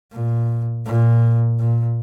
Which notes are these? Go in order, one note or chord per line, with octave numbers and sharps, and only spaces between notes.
A#2
A#2
A#2